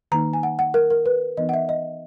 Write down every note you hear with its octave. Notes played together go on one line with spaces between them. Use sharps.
D#3 A#3 D#4 A#5
G#5
F#5
F#5
A#4
A#4
B4
E3 B3 D#4 D#5
F#5
E5
D#5